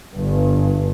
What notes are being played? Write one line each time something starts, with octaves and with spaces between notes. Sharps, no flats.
G1 G2